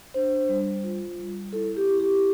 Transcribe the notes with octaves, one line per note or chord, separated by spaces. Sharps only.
D4 C5
G3
F4
G3
E4 A4
G4
E4
G4